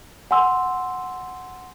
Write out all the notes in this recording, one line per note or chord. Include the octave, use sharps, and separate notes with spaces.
F#5 G#5 C6 E6